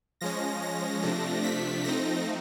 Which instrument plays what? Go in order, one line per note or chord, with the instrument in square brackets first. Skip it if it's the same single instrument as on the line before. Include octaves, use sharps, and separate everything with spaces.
[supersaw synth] F3 G#3 C#4 A#6
A#6
C3 F3 A3 D4
B6
F3 A3 C4 D#4 A#6